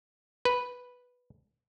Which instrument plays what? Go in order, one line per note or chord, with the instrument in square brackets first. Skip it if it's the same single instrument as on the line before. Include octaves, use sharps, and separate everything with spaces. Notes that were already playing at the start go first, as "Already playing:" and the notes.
[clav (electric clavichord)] B4